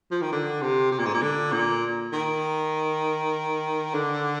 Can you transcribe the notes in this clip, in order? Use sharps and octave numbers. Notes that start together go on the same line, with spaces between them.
F3
D#3
D3
C3
C3
A#2
G#2
A#2
D3
A#2
D#3
D3